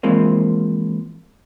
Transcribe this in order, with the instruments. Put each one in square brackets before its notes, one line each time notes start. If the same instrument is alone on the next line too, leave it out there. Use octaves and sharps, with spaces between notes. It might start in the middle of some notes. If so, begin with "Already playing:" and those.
[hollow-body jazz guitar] E3 F3 G#3 A#3 C4